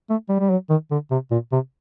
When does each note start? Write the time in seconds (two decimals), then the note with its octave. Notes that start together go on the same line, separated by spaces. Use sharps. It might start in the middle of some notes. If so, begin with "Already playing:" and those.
0.10 A3
0.29 G3
0.40 G3
0.50 F#3
0.70 D#3
0.91 D3
1.11 C3
1.31 A#2
1.52 C3